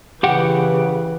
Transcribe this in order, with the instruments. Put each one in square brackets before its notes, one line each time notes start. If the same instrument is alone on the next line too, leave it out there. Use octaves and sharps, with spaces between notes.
[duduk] C#3 [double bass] E3 [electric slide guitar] G4 F#5 G5